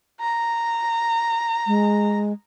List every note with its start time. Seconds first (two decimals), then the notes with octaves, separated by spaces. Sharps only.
0.21 A#5
1.67 G#3